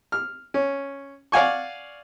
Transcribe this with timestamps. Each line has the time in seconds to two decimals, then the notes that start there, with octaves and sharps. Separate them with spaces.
0.12 F6
0.54 C#4
1.32 D5 F5 F#5 G#5 C#6